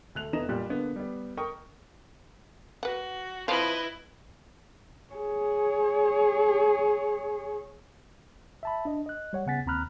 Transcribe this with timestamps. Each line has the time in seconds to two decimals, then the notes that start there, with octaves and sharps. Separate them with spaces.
0.15 D2 A3 F#6 F7
0.33 F1 E3 B3 D#5 A#5 E7
0.48 F#1 A#2 G3 G4 F#6
0.70 D3 A#3 B3
0.96 G3 B3
1.37 A#4 G5 C#6 D#6
2.83 F#4 B4 F#5
3.48 F3 C4 E4 F4 B4 D#5
5.13 G#4 C#5
8.63 E5 A5 B5
8.85 D4 D#5
9.06 D#5 F#6
9.33 G3 C#5 F#5
9.46 C#3 B3 F#5 G#5 A6 B6
9.66 D#2 C4 A#5 B5 F6 F#6